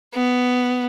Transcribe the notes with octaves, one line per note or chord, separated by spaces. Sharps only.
B3